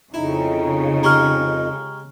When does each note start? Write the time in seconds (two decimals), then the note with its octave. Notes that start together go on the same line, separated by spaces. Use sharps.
0.14 F2 C#3 D#4 E4
1.03 G#3 G4 G#4 A#5 C#6 F6